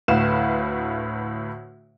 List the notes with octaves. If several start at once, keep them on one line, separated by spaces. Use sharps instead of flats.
D2 A2 B4 F5 E7